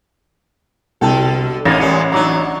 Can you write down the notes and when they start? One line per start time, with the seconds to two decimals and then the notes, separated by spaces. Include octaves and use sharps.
1.01 C2 B2 D3 A4 G5 A5
1.65 A1 A#3 D#4 G#5 A6 A#6
1.80 G3 G#3 A#4 C#7
2.12 F#3 D4 D#4 A#5 D6